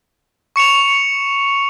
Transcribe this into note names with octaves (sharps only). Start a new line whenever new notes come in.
C#6 C#7 E7 F7